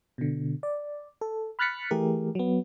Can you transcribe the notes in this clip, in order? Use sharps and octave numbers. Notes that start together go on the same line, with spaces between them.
B2 D3
D5
A4
B5 F6 F#6 A6 B6 C#7
E3 A3 G4 G#4 A#4
F#3 B3